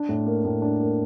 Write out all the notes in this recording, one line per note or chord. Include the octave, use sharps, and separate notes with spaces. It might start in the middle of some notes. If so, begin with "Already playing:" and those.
Already playing: D4
A2
A#3
A2
D4
A#3